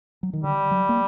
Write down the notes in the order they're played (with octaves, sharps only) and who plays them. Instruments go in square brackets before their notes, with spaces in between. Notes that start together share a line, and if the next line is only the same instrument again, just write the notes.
[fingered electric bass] F#3
D#3
[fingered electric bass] D3 [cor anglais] G3
[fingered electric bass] F#3
A#3